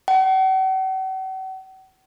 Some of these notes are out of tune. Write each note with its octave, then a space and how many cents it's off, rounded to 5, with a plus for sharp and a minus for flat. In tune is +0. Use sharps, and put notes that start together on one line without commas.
F#5 +45